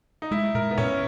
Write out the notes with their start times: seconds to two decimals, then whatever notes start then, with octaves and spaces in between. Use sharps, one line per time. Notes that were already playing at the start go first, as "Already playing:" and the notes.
0.22 D#4
0.31 G#3 E4
0.54 A#2 A#4
0.71 B3
0.78 A#2 C#4